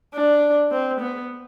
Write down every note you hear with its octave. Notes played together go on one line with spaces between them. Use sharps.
D4
C4
B3